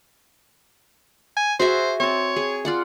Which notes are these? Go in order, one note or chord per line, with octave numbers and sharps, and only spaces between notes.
G#5
F#4 G#4 C5 E5
C4 C#5 A5
G#4
F4 D5 F#5